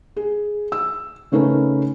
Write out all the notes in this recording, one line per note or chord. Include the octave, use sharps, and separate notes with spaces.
G#4
E6
C#3 A3 C#4 D#4 A#4 B4